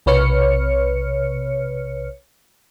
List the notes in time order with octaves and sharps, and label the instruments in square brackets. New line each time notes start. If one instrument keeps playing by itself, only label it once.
[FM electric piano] B1 C3 B4 C#5 F6 C#7